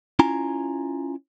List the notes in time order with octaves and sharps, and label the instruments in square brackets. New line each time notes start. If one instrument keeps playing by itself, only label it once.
[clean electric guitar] C#4 E4 F4 G#5 A#5